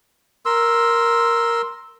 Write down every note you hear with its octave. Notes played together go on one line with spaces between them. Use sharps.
A#4 C6 E6